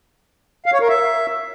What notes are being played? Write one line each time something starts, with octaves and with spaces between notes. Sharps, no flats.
F5
C#5
A#4
E5